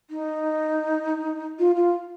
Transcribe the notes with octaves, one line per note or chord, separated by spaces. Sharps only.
D#4
F4
F4